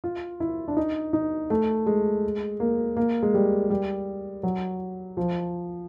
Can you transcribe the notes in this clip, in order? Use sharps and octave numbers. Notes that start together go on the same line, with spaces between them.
F4
E4
D4
D#4
D#4
A3
G#3
A#3
A#3
G#3
G3
G3
F#3
F3